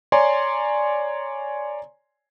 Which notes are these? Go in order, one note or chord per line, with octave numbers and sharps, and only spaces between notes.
C#5 D5 G#5 A#5 C6